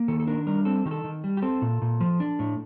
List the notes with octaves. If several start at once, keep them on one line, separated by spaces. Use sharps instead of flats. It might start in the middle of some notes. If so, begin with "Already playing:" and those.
Already playing: A#3
D#3 A4
A4
D4 A#4
G3 A#4
C4 A4
D#3 G4
A4
D#3
G3
G4
C4 A4
A#2
A#2
F3
D4
A2